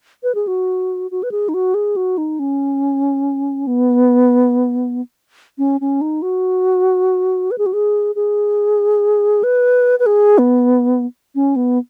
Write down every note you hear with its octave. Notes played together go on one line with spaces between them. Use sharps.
B4
G#4
F#4
F#4
B4
G#4
D#4
F#4
G#4
F#4
D#4
C#4
B3
C#4
C#4
D#4
F#4
B4
G#4
F#4
G#4
G#4
B4
B4
G#4
B3
C#4
B3